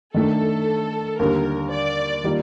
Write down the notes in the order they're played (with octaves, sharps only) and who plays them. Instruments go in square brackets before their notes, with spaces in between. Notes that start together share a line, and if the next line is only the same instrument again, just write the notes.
[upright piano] D#3 A3 D4 [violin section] A4
[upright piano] D#2 D3 G3 [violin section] A#4
[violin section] D5
[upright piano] D#3 G3 A#3 F4